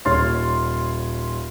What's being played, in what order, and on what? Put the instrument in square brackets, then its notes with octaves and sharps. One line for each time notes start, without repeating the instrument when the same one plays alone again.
[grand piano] D#1 C#5 C6 F6 A6